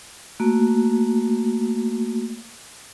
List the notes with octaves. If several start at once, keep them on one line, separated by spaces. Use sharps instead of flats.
A3 A#3 F#4